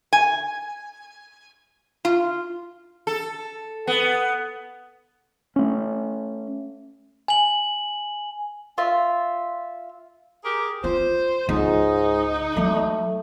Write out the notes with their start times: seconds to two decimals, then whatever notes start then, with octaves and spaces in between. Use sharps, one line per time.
0.13 G#5
2.05 F4
3.07 A4
3.87 B3
5.56 A3 C#4
7.28 G#5 F#7
8.78 F4 E5
10.44 G4 G#4 A#4
10.84 F4 C5
11.49 C#2 G#2 D#4
12.56 F#3 G#3 A3